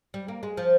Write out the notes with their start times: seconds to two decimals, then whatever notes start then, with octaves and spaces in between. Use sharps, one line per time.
0.14 G3
0.28 A#3
0.43 G#3
0.57 F3